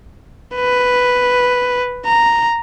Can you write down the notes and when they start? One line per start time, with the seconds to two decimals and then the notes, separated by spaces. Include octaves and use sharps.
0.56 B4
2.06 A#5